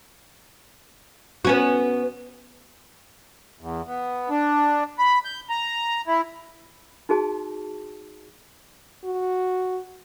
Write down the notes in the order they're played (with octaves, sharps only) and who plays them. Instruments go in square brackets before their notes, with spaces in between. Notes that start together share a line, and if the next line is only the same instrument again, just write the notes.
[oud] B3 C#4 F#4
[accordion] E2
B3
D4
B5
G6
A#5
E4
[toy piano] D#4 F#4 G#4 A5
[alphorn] F#4